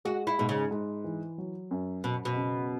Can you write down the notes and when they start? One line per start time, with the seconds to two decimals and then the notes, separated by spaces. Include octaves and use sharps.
0.05 G#3 F#4
0.27 E4
0.39 G#2 B2
0.49 C#3
0.71 G#2
1.04 E3
1.38 F#3
1.71 F#2
2.04 F#2 B2
2.25 B2
2.36 C#3